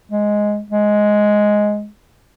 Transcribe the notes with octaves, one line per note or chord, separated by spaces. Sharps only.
G#3
G#3